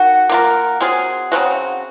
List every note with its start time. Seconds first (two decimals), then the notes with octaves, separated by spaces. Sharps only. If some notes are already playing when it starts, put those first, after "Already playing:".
Already playing: D#3 F#4 F#5
0.29 A#3 F4 A#4
0.80 F#3 C4 F4 G#4
1.32 C#3 F#3 C4 F#4